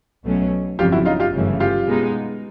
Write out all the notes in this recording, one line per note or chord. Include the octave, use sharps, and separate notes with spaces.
B1 B2 F#3 A3 C#4
G1 F2 C#3 F#3 F4 G4
E4 F#4
D#4 F4
F4 G4
G1 F#2 C#3 E3 A3
F4 G4
B2 G#3 B3 D#4